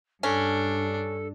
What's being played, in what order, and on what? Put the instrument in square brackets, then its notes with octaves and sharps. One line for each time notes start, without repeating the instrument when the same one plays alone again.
[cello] G2 [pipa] C#4 [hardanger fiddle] D4 [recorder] A4